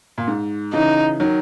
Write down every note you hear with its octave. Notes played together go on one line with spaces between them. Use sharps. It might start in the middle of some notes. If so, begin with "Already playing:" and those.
A#2
G#2
C#3 E3 D#4
D#3 F#3